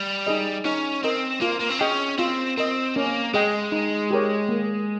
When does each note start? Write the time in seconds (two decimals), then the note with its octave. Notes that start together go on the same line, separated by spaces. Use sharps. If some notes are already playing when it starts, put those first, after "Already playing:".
Already playing: G3
0.27 D#4 G#4 D#5
0.65 C#4 D#4
1.03 C4 A#4 D#5
1.42 A#3 F4
1.61 A#3
1.70 C4
1.80 C#4 G#4 D#5 G5
2.19 C4 F4
2.57 C4 A#4 D#5
2.96 A#3 C#4
3.34 G#3 G#4 D#5 G5
3.72 D#4
4.11 G4 A#4 C#5
4.49 A#3